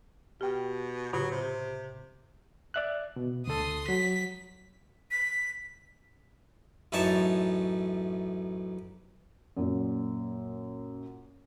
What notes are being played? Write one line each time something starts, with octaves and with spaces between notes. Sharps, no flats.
B2 G4 G5
A2 C#3 F#3 F4
C3
D5 E5 F#6
B2
D2 A4 C6 D#6
F#3 B6
B6
A1 F#2 A2 D#4 C#5 A5
F#2 A#2